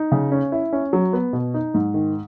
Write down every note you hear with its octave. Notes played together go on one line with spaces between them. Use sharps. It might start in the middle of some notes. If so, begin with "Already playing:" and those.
Already playing: D#4
C#3
C#4
E4
C#4
F#3
B3
B2
D#4
G#2
D#3